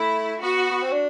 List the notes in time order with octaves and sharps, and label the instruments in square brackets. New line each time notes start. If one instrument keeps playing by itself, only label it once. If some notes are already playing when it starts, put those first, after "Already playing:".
Already playing: [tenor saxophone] A3 [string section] E4
[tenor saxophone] B3 [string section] F#4
[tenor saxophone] B3
C4
D4